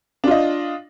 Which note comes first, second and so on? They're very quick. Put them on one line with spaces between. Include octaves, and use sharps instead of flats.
D4 F4 D#5